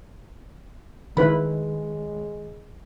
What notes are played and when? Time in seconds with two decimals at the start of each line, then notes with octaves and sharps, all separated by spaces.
1.17 D#3 G#3 E4 B4 B5